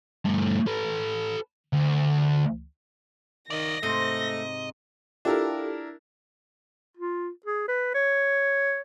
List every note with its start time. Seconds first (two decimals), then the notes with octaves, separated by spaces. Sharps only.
0.25 G2 A3
0.67 A4 B4
1.73 D2
3.50 D#3 D5 D#5 A#6
3.83 G#2 C3 A3 C5 D#5
5.25 D4 E4 F4 G4 A4 A#4
6.97 F4
7.46 G#4
7.68 B4
7.95 C#5